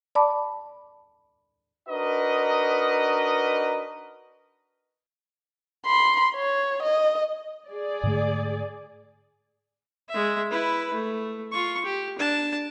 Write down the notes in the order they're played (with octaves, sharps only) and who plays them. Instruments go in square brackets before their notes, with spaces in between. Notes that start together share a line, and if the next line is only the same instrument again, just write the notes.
[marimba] D5 A5 B5 D6
[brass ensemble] D4 D#4 F#4 A#4 B4 D#5
[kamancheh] B5 C6
C#5
D#5
[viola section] G#4 D5
[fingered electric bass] G#2 D3 A3
[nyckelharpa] G#3 E5
E4 B4
A3
F4 C#6
G4
D4 A5